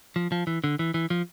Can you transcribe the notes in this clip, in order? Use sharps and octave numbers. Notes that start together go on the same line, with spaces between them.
F3
F3
E3
D3
E3
E3
F3